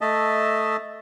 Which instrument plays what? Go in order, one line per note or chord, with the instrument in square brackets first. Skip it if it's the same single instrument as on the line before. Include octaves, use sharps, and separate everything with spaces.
[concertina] A3 D#5 E5 A5